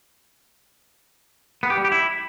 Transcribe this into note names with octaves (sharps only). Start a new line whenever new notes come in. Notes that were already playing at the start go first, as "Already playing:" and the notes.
B3
G4
G3
G4
E4